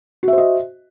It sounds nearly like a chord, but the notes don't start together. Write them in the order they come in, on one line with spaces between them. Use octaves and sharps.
F#4 E5 C5 D#5